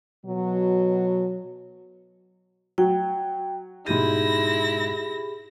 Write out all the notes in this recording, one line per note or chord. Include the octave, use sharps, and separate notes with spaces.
B2 F#3
F#3 G5
G#2 B2 E4 G4 G#4 B5 A#6 D#7